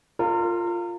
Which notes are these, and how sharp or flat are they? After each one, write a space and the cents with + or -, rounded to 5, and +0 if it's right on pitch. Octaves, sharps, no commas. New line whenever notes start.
F4 +0 A#4 -35